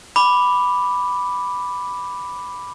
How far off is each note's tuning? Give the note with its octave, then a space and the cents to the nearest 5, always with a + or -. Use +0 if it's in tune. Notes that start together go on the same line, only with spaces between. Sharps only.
B5 +0 D6 +0